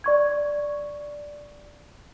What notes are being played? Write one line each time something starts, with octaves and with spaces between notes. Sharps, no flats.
D5 C#6 G#6